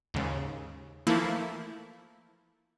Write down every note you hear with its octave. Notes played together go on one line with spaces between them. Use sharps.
D#2 G#2 C#3
E3 F3 A3 A#3 E4